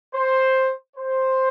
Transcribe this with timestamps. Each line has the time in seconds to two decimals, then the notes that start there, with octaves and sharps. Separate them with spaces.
0.13 C5
0.97 C5